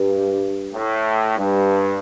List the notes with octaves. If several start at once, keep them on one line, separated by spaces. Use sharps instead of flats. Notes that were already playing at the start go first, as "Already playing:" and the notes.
Already playing: G2
A2
G2